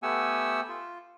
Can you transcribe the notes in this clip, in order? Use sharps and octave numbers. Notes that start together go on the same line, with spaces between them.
A3 B3 G4 F#5 G#5 E6
F4